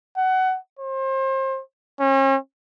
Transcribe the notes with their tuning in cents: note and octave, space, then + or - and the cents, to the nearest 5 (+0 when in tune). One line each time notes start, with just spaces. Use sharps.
F#5 +20
C5 +30
C#4 -40